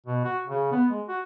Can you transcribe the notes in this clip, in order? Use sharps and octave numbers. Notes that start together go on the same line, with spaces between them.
B2
F#4
C#3
B3
G#3
F#4